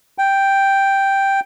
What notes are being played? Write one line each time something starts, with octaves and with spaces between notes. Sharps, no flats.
G5